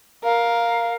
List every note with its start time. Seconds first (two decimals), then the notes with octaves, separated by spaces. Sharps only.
0.24 A#4 F5